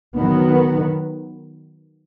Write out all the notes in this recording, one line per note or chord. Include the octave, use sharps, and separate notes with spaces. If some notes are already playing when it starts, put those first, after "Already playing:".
D#3 F#3 B3